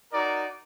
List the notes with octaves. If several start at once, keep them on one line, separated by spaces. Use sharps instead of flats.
D#4 F#4 A#4 D5